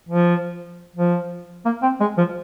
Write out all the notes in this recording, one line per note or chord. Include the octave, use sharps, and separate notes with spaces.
F3
F3
A#3
C4
G#3
F3